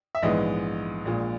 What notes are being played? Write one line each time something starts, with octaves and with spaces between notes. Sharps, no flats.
E5
A#1 G#2 E3 G#3 B3 D#5
A#1 A#2 G#3